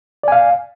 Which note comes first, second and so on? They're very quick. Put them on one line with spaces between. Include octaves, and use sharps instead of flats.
D5 G#5 F5